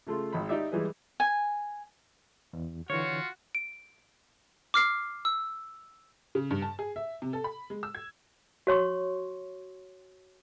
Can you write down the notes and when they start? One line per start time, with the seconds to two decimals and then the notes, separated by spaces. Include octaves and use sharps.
0.07 C#3 A3 F4
0.33 G#1 B5
0.49 D#4 G4 D5 E5
0.72 E3 G3 G#3 G#4 B4
1.20 G#5
2.53 E2
2.90 D3 E3 F4 F#4 C#5
3.55 D7
4.74 D6 F6 C7
5.25 E6
6.35 C#3
6.51 G2
6.62 A5
6.79 G#4
6.96 E5
7.22 C3
7.33 A4
7.44 B5
7.70 G#3
7.83 E6
7.95 G#6
8.67 F#4 C#5 C6 C#6